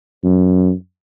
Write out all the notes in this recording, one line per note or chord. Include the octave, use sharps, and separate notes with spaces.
F#2